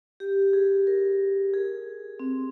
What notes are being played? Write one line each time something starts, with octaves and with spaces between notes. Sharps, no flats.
G4
G#4
A#4
G#4
C4